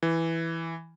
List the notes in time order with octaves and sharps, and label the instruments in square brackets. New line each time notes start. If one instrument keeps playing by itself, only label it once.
[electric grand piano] E3